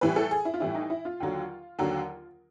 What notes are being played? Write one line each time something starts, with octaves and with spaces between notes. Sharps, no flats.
A2 E3 G3 B4
A4
G#4
E4
F4
A2 E3 G3 E4
D#4
E4
F4
D#2 D3 F#3
D#2 D3 F#3